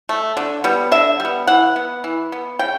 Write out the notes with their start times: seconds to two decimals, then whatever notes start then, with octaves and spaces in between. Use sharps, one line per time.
0.09 A3
0.37 D3
0.64 G3 B3
0.92 D3 E5
1.20 G3 B3
1.47 E3 F#5
1.76 B3
2.04 E3
2.32 B3
2.59 C#3 G5